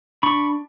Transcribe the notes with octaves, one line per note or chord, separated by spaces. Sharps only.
D4 B5 C#6